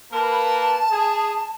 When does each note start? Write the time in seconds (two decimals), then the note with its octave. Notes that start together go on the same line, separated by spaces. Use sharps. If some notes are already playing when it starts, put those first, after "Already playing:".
0.12 A#3 A#4 B4 A5
0.91 G#4